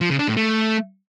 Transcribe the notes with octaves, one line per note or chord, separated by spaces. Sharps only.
F3
C#3
D4
A2
A3